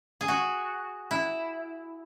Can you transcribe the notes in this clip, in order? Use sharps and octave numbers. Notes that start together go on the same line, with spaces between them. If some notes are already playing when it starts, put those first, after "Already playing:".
G#4
F#4
E4